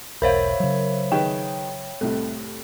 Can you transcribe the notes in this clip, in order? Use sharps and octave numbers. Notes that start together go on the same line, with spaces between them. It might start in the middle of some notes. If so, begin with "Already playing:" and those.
E1 B1 A#4 C5 C#5 E5 F5 B5
C#3 F#3
D#3 G#4 B4 G5
C2 A2 C3 A4